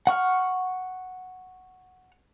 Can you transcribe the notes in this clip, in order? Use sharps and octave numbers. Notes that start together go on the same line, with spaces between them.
F#5 C#6 F6